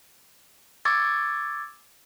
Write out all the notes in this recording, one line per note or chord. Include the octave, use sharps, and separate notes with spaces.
C#6 D6 E6 G#6 A6